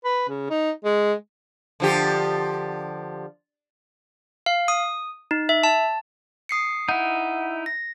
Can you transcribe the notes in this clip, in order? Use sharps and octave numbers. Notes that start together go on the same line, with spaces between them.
B4
C#3
D#4
G#3
D3 F3 G4
F5
D#6
D#4
E5
A5
D#6 C7 C#7
D#4 E4 F#5
A#6